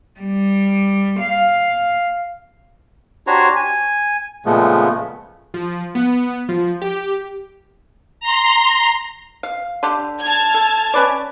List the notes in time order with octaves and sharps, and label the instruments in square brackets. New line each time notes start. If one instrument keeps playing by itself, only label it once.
[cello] G3
F5
[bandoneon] D4 F#4 G4 C5 C#5 A#5
G#5
A#2 C#3 F3 G#3 A3 B3
[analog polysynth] F3
B3
F3
G4
[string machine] A#5 C6
[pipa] F5
D3 G4
[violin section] A5 F6 G#6
[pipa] A4
C#4 B4 D5